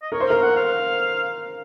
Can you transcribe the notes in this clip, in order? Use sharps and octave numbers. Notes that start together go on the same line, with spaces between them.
D#5
A#4 C#5
C5
A#4 F5
F#5
F5